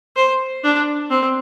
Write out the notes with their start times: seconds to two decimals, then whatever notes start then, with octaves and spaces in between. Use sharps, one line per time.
0.16 C5
0.64 D4
1.10 C4